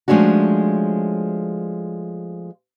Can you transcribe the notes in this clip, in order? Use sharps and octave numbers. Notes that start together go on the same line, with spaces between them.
F3 G#3 A3 C#4 D4 F#4